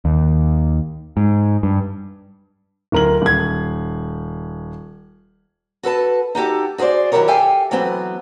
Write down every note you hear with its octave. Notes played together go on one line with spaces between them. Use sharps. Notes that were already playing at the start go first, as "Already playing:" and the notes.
D#2
G#2
G2
D1 A#4 F#7
D#1 G#6
F#4 A4 B4 A5
D#4 F#4 G4 A4
F#4 G#4 A#4 C5 D5
D#3 F#3 E4 G4 A#4 C#5
G4 A4 E5 F5 G5 G#5
E3 F#3 A3 B3 C4